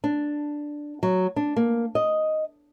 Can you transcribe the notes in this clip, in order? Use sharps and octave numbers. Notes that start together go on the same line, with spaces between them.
D4
F#3
D4
A#3
D#5